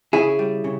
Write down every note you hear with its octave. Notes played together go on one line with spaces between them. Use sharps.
C#3 E4 G#4
G3
C#3